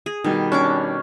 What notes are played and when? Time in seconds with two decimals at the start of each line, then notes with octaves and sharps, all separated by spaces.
0.06 G#4
0.24 B2 D#3 G3
0.52 C#4 D4 C#6 D6